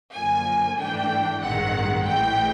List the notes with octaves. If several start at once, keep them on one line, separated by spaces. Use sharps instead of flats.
F#2 D3 F3 A#3 G#5
G#2 E3 A3 D4 G5
A1 G2 D#3 G#3 C4 F#5
A1 A2 E3 G#3 G5